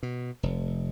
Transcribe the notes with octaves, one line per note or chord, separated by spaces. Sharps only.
B2
F1